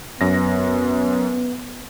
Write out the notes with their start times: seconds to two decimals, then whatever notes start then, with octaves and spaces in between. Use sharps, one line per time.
0.21 F#2 B3 A#6